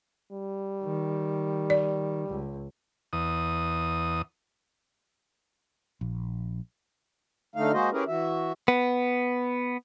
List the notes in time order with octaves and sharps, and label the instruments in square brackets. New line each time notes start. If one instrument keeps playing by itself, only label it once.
[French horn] G3
[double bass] D#3
[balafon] D5
[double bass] C#2
[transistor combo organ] E2 D#6
[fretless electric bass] A#1
[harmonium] D3 A3 D#4 F5
G#3 A#3 F#4 C5 D#5
C#4 E4 G4 G#4 A#4 B4
E3 F#4 E5
[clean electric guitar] B3